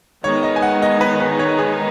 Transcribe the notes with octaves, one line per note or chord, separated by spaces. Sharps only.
D#3 G#3 B3 D#4 C#5
D#5
G#5
F#5
D#5
B4
B4
C#5
G#4